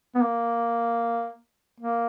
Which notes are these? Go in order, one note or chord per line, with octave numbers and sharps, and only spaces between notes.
B3
A#3
A#3